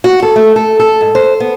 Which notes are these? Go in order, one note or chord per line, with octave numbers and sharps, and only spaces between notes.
F#4
A4
A3
A4
A4
G#2
C5
B3